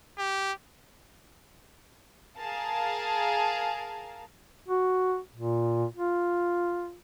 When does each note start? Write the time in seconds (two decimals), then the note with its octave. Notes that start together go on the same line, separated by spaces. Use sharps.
0.18 G4
2.38 G#4 A#4 F5 A5
4.68 F#4
5.35 A#2
5.96 F4